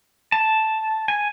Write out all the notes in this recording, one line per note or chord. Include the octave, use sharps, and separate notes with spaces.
A5
G#5